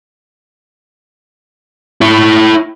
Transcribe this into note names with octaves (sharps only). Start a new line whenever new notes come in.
E4 C#5